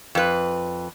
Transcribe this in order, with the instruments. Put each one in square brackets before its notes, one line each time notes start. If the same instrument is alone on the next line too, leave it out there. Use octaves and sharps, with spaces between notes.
[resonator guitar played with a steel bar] F2 B4